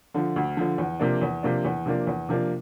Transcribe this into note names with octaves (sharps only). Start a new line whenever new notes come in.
D3 F3
D2
D3 F3
E2
C3 F3 A#3 D4
E2
C3 F3 A#3 D4
E2
C3 F3 A#3 D4
E2
C3 F3 A#3 D4